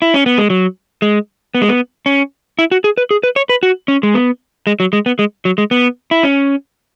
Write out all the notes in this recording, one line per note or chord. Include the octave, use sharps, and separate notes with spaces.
E4
C#4
B3
G#3
F#3
G#3
B3
G#3
B3
C#4
E4
F#4
G#4
B4
G#4
B4
C#5
B4
F#4
C#4
G#3
B3
G#3
F#3
G#3
B3
G#3
F#3
G#3
B3
E4
C#4